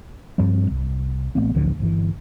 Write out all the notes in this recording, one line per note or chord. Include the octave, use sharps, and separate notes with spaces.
G2 F3 G3 C4
C2
A1 A3 B3 C4
A1 D2 D3 F3
G1 C3 E3